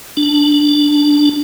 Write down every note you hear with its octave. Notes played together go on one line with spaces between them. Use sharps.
D4